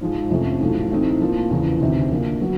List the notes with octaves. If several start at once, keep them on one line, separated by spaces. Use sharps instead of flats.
G#2 F3 G#3
F2 C3 F3 A3 C#4
B1 A2 F3 A3
A2 E3 A3 C4 D#4
A2 F3 A#3
E2 C#3 F3
D2 C3 D#3
D3 F3 A#3
F#3 B3